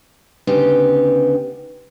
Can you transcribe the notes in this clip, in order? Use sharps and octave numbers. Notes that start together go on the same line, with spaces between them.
D2 C#3 B3 D#4 G4